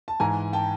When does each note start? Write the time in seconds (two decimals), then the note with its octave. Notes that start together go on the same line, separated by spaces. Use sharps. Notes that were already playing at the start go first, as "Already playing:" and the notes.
0.08 A5
0.20 G#2 E3 G#5 A#5
0.53 G5 A5